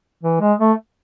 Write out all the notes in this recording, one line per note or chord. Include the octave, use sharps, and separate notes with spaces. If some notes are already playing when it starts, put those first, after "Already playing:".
E3
G#3
A3